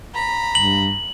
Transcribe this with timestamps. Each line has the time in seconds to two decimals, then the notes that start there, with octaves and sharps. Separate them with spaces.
0.15 A#5 B5
0.55 G2 F#7